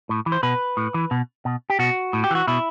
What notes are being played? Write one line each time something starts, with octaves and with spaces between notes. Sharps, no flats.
A2
E3
C5
B2 B4
A2
E3
B2
B2
G4
B2 F#4
A2
G4
E3 F#4
B2 E4